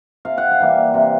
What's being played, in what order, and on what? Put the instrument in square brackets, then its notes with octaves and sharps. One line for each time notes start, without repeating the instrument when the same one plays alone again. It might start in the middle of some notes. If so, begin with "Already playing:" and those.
[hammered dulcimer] C3 F5
F#5
F5
E3 G3 A#3
C3